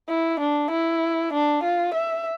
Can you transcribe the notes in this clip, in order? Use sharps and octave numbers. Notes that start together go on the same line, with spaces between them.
E4
D4
E4
D4
F4
E5